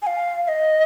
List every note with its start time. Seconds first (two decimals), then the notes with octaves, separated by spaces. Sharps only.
0.02 G#5
0.07 F5
0.43 F5
0.48 D#5